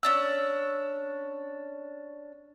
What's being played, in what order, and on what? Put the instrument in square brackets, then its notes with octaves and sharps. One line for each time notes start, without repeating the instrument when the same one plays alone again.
[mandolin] C#4 D4 E6